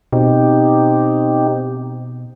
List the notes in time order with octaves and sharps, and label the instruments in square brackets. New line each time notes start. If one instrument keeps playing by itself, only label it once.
[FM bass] B2 [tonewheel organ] C4 D#4 G4